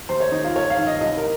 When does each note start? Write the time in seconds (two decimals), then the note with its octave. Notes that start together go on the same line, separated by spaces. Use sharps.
0.09 D#2 C5
0.20 C#5
0.32 D#3 D#4
0.44 F4
0.55 G2 C#5
0.70 F5
0.78 D#3
0.87 D#5
1.01 C2 D#5
1.17 A#4